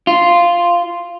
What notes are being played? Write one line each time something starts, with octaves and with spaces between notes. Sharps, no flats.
F4